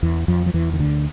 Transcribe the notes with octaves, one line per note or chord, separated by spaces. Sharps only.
E2 E3
F2 F3
F3
E2 E3
D#3
D2 D3